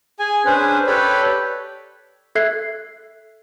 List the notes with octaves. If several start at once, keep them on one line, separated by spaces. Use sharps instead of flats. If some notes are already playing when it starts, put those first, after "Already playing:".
G#4 G#5
C#4 D4 G#4 B4 C5
G4 A4 B4 C#5 D5 B5
A4 E5 F#6 G#6 C7